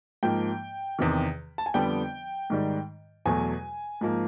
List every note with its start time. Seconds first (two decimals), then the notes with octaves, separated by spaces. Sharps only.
0.23 G#2 F3 A#3 G5
0.99 E2 C3 D#3
1.58 A5
1.66 G#5
1.74 F2 D3 G3 B3 G5
2.50 G#2 D#3 G3
3.26 E2 B2 F#3 A3 G#5
4.01 G#2 F3 A#3